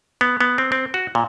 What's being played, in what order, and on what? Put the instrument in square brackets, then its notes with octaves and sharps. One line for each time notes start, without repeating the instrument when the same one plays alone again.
[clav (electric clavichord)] B3
B3
C4
C4
F#4
A#2